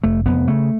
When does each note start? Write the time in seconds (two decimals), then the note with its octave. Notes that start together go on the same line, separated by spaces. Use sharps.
0.03 F1 A3
0.25 F1 B3
0.48 C#3 A3